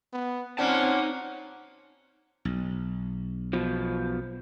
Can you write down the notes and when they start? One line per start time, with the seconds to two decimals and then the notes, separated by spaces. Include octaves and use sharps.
0.13 B3
0.58 A#2 A#3 C4 C#4 D#4 F#5 A5
2.45 B1
3.53 B2 F3